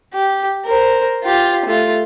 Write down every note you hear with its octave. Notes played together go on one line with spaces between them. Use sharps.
G4
A#4 C5
F4 G4
A3 F4